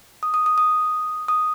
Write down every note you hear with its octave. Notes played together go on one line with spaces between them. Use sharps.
D#6
D#6
D#6
D#6
D#6